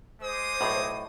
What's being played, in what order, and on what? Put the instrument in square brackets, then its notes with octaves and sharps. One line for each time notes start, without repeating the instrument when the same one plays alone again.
[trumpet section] G#3 D6 D#6 [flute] C5
[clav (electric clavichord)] B1 A2